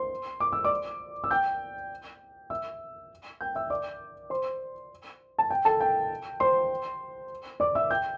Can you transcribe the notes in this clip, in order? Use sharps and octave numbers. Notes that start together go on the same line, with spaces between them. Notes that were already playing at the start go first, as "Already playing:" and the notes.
Already playing: C5 C6
D6
E6
D5 D6
E6
G5 G6
E5 E6
G5 G6
E5 E6
D5 D6
C5 C6
A5
G5
A4 A5
G5
C5 C6
D5 D6
E5 E6
G5 G6